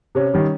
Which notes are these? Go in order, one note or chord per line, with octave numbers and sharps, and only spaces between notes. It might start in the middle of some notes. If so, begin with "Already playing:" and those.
C3 C#4
D#3 G3